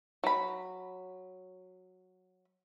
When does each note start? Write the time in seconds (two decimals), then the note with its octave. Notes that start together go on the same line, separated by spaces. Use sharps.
0.24 F#3 B5